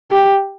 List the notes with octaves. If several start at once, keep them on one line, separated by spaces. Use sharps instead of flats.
G4